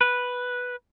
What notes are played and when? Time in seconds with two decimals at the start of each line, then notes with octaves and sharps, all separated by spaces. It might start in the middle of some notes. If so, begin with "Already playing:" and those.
0.01 B4